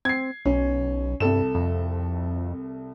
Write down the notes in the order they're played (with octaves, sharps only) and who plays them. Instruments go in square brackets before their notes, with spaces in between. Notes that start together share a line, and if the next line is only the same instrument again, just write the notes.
[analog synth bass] C4 [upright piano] G#6 C7
[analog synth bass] B1 [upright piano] C#4
[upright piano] C2 A4 E7 [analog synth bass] G2
[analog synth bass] F2